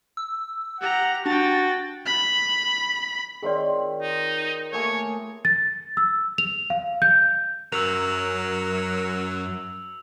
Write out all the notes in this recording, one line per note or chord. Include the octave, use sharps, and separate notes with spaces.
E6
G4 F#5 A#5
D4 F#4 G5 A6
B5
D#3 C4 F4 G#4 C#5 D5
D#4
A3 A#3 G#4 C#5
A6
E6
F7
F5
G6
F#2 F#3 A#4 E6 F7